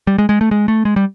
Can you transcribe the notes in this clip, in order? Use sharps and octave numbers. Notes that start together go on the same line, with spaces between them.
G3
G#3
G#3
A3
G#3
A3
G#3
G3